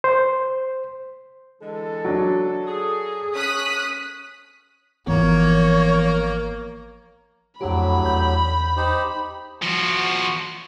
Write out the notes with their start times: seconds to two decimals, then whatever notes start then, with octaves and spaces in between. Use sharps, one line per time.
0.04 C5
1.62 D3 E3 G#3 A4
2.05 F#3 D4
2.67 G#4
3.35 C#4 D#6 F#6 B6
5.07 G#1 E3 F3 A#3 B3 C#5
7.61 F2 A2 D3 F#3 G4 B5
8.02 E2 G6
8.77 D#4 G4 C5
9.62 F3 F#4